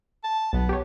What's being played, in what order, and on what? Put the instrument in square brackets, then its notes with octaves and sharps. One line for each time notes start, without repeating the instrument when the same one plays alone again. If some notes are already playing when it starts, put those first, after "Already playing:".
[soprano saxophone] A5
[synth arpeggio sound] B1 [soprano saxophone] B3
[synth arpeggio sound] G4 C#5